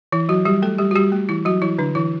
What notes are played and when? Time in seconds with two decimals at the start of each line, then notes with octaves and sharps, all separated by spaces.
0.12 E3 E4
0.29 F#3 F#4
0.45 G3 G4
0.62 A3 A4
0.78 G3 G4
0.91 F#4
0.96 G3 G4
1.12 A3
1.29 E3 E4
1.45 F#3 F#4
1.62 E3 E4
1.78 D3 D4
1.95 E3 E4